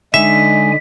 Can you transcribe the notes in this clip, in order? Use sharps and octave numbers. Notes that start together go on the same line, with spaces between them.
D3 G#3 D#4 E5 G#5 B6